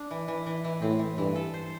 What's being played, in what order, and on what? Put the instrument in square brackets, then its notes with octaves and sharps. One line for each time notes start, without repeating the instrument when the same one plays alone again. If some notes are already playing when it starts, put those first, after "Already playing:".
Already playing: [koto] D4
E3
E3
E3
E3
[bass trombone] A2 [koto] C4
[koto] E3
[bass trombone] G2 [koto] E3
[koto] A4
C5